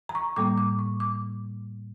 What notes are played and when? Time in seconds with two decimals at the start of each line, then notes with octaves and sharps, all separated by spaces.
0.09 A#5
0.15 C#6
0.36 A2 G3 A#3 D6
0.58 D6
0.79 C#6
1.00 D6